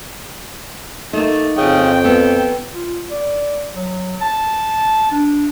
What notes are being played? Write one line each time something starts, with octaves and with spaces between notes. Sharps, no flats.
A3 A#3 D#4
F2 C#3 G5
B3 A4
F4
D5
F#3
A5
D4